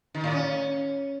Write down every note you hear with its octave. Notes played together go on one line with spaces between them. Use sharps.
D#3
A2
C#4